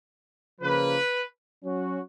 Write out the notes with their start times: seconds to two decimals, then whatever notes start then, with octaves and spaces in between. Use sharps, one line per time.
0.61 C#3 F3 A#3 B4
1.64 F#3 C#4 F#4